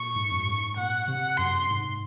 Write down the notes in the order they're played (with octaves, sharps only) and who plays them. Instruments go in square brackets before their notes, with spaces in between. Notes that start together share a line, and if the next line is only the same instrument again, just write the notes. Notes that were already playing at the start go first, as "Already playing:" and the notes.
Already playing: [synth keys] A#2 [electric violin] C#6
[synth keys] G#2
F#2
G#2
[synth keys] A#2 [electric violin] F#5
[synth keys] C3 [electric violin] F#5
[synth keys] F#2 [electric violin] C6
[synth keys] G#2